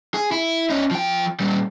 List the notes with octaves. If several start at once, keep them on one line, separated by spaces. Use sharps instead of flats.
G#4
E4
C#4 D#4
F3 G5
A#2 G3